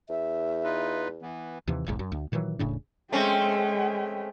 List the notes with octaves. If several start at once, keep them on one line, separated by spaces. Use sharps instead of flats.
E2 E5
D#4 F4 B4
E3 B3
D#2 C3 E3
E1 B1 G#2
F#2
D2
A#2 D#3 E3 F#3
E1 A2 C#3 D4
G#3 A3 C4 C#4 G5